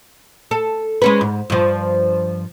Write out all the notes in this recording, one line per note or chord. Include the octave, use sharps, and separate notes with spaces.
A4
G#3 C#4 B4
G#2
G2 F3